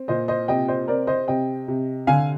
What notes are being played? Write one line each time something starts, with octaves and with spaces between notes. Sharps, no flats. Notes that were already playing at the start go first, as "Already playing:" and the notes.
Already playing: C4
A#2 C5 D#5
C5 D#5
C3 D#5 G5
C5 D#5
C4 A#4 D5
C5 D#5
C3 D#5 G5
C3
D3 F5 G#5